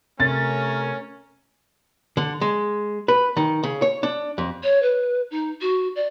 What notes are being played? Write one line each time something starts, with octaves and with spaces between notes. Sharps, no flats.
C3 A3 C#4 A#4 A6
D3
G#3
B4
D#3
C#3
C#5
D4
F2
C#5
B4
D#4
F#4
D5